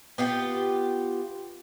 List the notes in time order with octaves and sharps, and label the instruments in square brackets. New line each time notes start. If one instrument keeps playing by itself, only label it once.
[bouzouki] B3 F4 G4